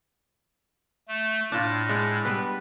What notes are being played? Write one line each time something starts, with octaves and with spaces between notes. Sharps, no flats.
A3
A2 D4 F4
G#3 D4
G3 B3 B4